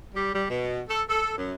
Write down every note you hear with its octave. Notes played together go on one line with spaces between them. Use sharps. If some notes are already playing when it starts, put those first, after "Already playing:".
G3
G3
B2
A4
A4
F#2